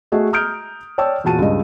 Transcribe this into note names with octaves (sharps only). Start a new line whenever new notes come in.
A3 F#4 G#4 D#5
A#5 D#6 F6 G6 D7
C#5 D5 G5 A5 E6
E2 A#2 F#4 A5 D#7
C#2 G2 D#5